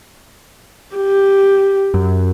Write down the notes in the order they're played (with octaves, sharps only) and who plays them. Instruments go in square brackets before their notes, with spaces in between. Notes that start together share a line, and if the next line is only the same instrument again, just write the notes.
[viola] G4
[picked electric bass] F#2